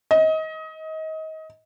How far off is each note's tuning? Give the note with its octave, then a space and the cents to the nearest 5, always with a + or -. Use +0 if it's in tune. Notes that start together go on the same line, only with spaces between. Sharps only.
D#5 +25